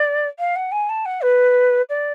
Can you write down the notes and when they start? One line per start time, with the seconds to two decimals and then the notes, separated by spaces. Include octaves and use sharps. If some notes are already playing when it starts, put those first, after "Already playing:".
Already playing: D5
0.39 F5
0.56 F#5
0.72 G#5
0.89 A5
1.05 F#5
1.21 B4
1.89 D5